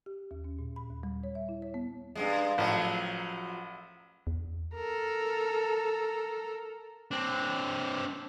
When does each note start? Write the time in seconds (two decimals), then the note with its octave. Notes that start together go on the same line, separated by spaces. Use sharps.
0.06 G4
0.31 D#2
0.44 C#4
0.59 A#2
0.76 B5
0.90 D#2
1.03 G3
1.23 C#5
1.35 E5
1.49 E4
1.62 C#5
1.74 B3
2.15 G2 B2 G#3
2.58 A1 F3 F#3
4.27 E2
4.75 A4 A#4
7.11 C4 D4